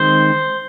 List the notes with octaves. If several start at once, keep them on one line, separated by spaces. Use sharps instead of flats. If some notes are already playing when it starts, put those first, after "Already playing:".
Already playing: D#3 G#3 C4 C5